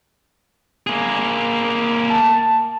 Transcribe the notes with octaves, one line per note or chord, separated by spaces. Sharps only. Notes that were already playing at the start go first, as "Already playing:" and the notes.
A#3 G#4
A5